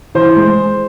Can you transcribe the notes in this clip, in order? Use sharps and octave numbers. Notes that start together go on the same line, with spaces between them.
E3 C5
G#3